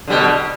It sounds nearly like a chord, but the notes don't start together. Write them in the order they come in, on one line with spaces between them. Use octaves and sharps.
D3 G3 B2